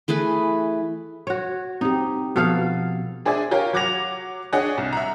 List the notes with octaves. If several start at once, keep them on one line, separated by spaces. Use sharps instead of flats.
E3 A3 G#4 B4
F#4 C#5
C4 D#4 G4
B2 F3 B3 A4 F5
D4 G#4 C5 D5 E5 G#5
G4 A#4 C#5 F5 G#5
F#3 F#5 D6 G#6 A#6 F7
D4 G#4 C#5 D#5 F#5 G#5
C2
E5 F#5 A#5